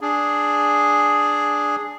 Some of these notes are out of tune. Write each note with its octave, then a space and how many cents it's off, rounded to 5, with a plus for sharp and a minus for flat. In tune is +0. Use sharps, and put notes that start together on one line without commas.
D4 +0 G#4 +0